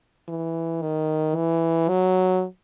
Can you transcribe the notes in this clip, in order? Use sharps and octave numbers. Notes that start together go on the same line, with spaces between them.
E3
D#3
E3
F#3